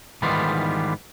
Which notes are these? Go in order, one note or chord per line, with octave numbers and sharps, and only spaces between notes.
G#2 D#3 E3 G3 B3 F4